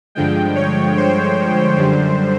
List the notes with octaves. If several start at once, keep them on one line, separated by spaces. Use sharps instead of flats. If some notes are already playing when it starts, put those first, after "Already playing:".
G2 D3 F3 G#3 G5
C#5
C5
F#2 D3 G3